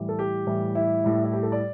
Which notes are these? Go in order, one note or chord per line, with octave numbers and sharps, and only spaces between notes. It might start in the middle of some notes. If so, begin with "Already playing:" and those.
Already playing: A2 E3 G3
A4
G4
A2 E3 G3
E4
A2 G3
E4
G4
A4
D5